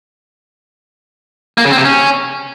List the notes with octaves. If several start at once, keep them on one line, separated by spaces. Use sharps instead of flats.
A#3
C#3
C4
C3
C#4